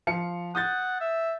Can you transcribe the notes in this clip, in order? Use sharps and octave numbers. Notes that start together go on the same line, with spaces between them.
F3 F5 C#7
F#5 D#6 G6 A6
E5